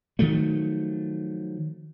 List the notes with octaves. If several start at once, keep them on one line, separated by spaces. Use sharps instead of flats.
D#3 F3 F#3 A3